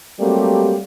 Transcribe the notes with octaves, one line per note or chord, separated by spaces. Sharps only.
F#3 G3 A3 A#3 C4 G4